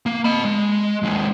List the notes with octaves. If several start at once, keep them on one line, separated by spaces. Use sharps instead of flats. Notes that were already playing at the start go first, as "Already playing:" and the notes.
A#3
D#5 B5
G#3
D#2 G#3